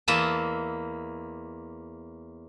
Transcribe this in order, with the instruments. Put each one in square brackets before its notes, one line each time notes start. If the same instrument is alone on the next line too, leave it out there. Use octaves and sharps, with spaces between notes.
[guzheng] E2 A#3 D#5 E5 A5